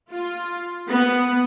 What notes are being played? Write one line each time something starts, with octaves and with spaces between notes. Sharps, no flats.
F4
B3